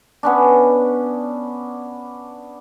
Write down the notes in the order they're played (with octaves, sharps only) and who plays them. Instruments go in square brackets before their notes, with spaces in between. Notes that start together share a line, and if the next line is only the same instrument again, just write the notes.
[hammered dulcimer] B3 C#4 D4